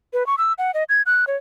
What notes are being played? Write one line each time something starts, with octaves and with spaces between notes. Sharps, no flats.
B4
C#6
E6
F#5
D#5
G#6
F#6
C#5